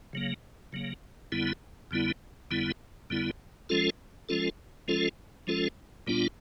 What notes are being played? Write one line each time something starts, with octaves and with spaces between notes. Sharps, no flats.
C#3 F#3 A#3
C#3 F#3 A#3
F2 D3 G3 B3 E4
F2 D3 G3 B3 E4
F2 D3 G3 B3 E4
F2 D3 G3 B3 E4
F3 G#3 C#4 F4 A4
F3 G#3 C#4 F4 A4
F3 G#3 C#4 F4 A4
F3 G#3 C#4 F4 A4
A#2 G3 B3 D4 F4